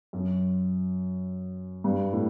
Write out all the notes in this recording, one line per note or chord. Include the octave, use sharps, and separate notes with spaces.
F#2
G2
A2